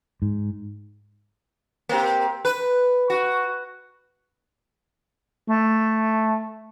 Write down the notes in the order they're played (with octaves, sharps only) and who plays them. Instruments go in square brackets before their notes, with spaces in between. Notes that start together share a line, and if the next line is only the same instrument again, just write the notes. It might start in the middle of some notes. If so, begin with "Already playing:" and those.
[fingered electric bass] G#2
[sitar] A#3 C4 G4
B4
F#4
[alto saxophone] A3